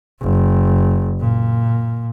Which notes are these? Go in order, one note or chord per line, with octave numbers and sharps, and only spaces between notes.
F#1
A#2